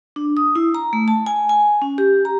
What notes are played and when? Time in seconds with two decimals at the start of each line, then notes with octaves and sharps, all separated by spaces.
0.16 D4
0.37 D#6
0.55 E4
0.75 A#5
0.93 A3
1.08 A5
1.26 G#5
1.49 G#5
1.82 C#4
1.98 G4
2.25 A#5